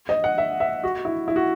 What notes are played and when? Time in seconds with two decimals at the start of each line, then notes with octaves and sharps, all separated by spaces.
0.09 D#5
0.24 F#5
0.38 E5
0.60 E5
0.84 F#4
1.05 E4
1.28 E4
1.36 F#4